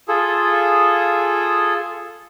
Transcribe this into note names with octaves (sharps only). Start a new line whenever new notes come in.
F4 G#4 A4